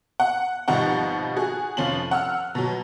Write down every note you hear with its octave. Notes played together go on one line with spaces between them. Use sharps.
F#5
G#1 B2 F3 G3 D#4 F#5
F#4 G#4
F1 F3 C#4 F4 F#7
F#5 E6 F6
B2 F#3